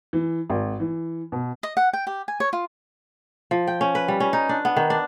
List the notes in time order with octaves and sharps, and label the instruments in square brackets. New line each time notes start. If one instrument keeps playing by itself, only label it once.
[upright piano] E3
G#1
E3
B2
[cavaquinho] D#5
F#5
G5
G4
G#5
C#5
F4
[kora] F3
G5
C#4
B4
G3
C#4
D#4
D4
B3
D#3
D4